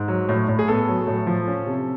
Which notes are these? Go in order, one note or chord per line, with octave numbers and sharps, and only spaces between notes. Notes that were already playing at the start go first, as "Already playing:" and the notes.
Already playing: G#2
F#3
A2
A2
G#4
B3 A4
F#3
A2
F3
C#4
C3